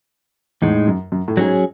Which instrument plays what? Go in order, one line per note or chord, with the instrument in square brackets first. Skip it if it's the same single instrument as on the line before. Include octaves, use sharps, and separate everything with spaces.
[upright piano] E2 [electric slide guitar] A2 G#3 D#4
[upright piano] F#2
F#2
A2
[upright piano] G#2 [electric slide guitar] F#3 C#4 G#4